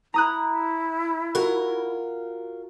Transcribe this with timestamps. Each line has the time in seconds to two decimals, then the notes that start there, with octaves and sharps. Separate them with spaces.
0.14 E4 A#5 D#6 F#6
1.35 F4 F#4 A#4